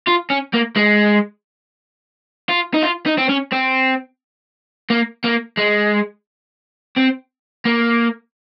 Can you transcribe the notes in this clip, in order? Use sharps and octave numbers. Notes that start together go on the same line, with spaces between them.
F4
C#4
A#3
G#3
F4
D#4
F4
D#4
C4
C#4
C4
A#3
A#3
G#3
C4
A#3